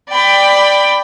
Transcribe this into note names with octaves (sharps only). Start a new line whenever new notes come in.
D5 G5 B5